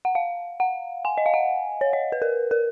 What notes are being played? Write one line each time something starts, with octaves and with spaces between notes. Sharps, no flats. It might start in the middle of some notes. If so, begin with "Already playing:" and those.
F#5
F5
F#5
G#5
D#5
F5
F#5
C#5
D#5
B4
A#4
A#4